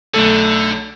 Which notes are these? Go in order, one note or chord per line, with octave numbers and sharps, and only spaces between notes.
B1 D3 A3 A4